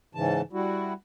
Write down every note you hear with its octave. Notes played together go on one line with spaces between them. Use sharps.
G#2 C#3 E3 A5
G3 E4 F#4